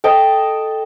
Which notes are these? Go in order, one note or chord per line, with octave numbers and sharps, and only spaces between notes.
A4 D#5 G5 A5